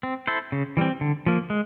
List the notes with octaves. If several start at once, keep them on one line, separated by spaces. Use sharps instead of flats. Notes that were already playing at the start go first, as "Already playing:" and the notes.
C4
E4 A4 C5
C#3
E3 G3 C4
D3
F3 A#3
G#3